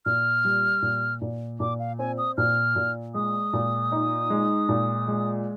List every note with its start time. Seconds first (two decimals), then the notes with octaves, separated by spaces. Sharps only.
0.05 A#2 F6
0.45 G3
0.82 A#2
1.22 A#2
1.60 A#2 D6
1.79 F5
1.99 C4 G#5
2.18 D#6
2.37 A#2 F6
2.76 A#2
3.14 G#3 D#6
3.53 A#2
3.92 D#4
4.30 G#3
4.69 A#2
5.07 G#3